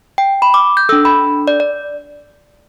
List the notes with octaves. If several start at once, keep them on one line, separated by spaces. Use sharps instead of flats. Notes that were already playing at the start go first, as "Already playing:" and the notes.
G5
B5
D6
G6
D4 A4 E6
B5
D5
D5